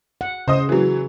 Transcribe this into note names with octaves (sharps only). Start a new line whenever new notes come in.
F#5
C#3 C5 D#5 D#6
E3 F#3